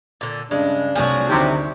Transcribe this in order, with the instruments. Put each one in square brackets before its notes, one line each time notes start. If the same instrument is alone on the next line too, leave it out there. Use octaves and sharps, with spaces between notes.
[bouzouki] A#2 D3
[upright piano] G2 C#3 [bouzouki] G#3 [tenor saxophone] D4
[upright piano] C2 A3 G#5 [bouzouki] F3 F#3 F#4
[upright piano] D2 D#3 [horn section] C3